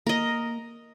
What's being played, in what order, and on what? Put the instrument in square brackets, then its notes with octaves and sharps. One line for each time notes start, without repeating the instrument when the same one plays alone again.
[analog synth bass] A#3 [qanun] A#4 D#5